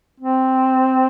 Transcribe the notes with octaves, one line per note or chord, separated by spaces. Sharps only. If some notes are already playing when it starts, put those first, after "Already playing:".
C4